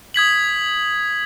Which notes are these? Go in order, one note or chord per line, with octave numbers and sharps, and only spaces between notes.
D#6 G#6 B6 F#7